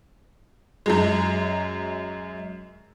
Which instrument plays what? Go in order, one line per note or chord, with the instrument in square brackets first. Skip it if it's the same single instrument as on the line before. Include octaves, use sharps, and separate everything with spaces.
[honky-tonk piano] F#2 F#3 G#3